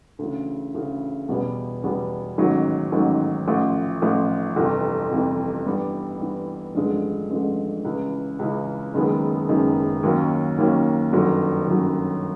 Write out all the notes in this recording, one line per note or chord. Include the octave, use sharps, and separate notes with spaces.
D2 C#3 E3
D2 C#3 E3
E2 B2 G3 B3
E2 B2 G3 B3
A1 G#2 D#3 F#3
A1 G#2 D#3 F#3
A1 A2 F3
A1 A2 F3
G1 F2 C3 E3
G1 F2 C3 E3
G2 E3 G3 B3
G2 E3 G3 B3
A1 G2 D3 F3 G#3
A1 G2 D3 F3 G#3
C#2 C#3 E3
C#2 C#3 E3
F#1 F#2 D#3 G#3 B3
F#1 F#2 D#3 G#3 B3
D#2 D#3 F#3 A#3 C#4
D#2 D#3 F#3 A#3 C#4
G1 F#2 D#3 F#3
G1 F#2 D#3 F#3